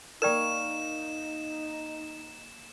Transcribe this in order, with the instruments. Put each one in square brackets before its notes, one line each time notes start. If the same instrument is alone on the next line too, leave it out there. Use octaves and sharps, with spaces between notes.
[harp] A#3 C#6 F6 [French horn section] D#4 [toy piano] A#4 D5 G5 [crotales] E7